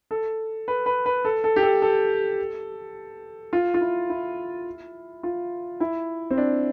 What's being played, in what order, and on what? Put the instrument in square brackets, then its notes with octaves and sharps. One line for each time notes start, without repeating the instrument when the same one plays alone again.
[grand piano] A4
B4
B4
B4
A4
A4
G4
A4
A4
F4
F4
E4
E4
F4
E4
C4
D4